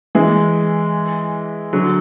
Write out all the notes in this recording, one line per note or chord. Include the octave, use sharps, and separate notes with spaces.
E3 G#3
D3 F#3